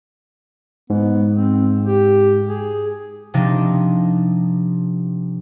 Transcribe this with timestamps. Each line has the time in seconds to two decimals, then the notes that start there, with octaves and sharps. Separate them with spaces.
0.90 G#2 B3
1.34 C4
1.86 G4
2.49 G#4
3.34 C3 F3 D4 D#4